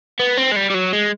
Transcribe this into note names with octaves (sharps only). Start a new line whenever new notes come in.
B3
C4
G#3
G3
G3
F#3
G#3